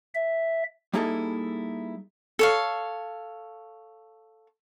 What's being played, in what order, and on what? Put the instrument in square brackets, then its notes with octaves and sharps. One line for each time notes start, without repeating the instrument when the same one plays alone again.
[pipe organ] E5
[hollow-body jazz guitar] G3 A#3 D#4 E4 G#4 A4
[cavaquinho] A4 C#5 F5